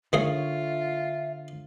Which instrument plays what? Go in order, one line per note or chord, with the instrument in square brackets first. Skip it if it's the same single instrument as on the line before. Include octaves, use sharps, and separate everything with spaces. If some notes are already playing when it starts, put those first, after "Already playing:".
[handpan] D3 C#5 [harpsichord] D#3 G#4 F5 [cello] F4 [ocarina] E5